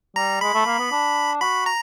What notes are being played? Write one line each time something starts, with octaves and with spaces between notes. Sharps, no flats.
G3 A#5
G#3 B5
A3
A#3
B3
D4
F#4 B5
A#5